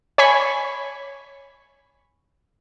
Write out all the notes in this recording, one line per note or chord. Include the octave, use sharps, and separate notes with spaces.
C#5 G#5 B5 C#6